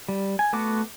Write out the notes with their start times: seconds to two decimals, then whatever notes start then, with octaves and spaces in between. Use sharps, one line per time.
0.09 G3
0.39 G#5
0.53 A3 B3 F#4 D6